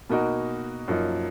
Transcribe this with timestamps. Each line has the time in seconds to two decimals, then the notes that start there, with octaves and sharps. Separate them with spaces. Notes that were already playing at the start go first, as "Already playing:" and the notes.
0.09 B2 A#3 D#4 F#4 A#4
0.88 F#2 F3 A#3 D#4